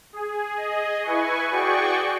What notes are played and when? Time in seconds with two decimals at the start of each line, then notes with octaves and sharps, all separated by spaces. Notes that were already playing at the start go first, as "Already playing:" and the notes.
0.13 G#4
0.55 G#4 D#5
1.03 E4 B4 G#5 C#6
1.51 F#4 G#4 D5 G5 C#6